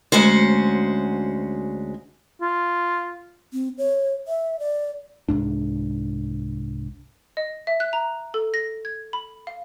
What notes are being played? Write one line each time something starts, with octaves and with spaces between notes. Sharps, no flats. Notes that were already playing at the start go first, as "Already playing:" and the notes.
D2 G#3 C#4 F#4 C5
F4
C4
C#5
E5
D5
C2 G#2 D4
D#5
E5
F#6
A#5
A4
A#6
G#6
B5
F5